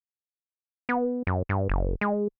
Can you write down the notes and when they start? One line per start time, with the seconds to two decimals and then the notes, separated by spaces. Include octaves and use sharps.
0.89 B3
1.27 F#2
1.49 G2
1.69 F#1
2.01 G#3